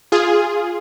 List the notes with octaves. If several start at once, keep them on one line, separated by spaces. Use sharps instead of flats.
F4 G#4